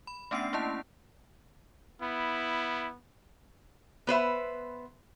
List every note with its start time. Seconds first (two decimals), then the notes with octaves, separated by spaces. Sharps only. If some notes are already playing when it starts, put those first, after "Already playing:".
0.07 B5
0.31 A3 B3 C#4 D4 F#5 C7
0.53 A3 A#3 C#4 E4 A5
2.02 B3 E4
4.07 B3 B4 C5 E5